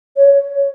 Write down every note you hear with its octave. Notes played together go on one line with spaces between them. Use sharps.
C#5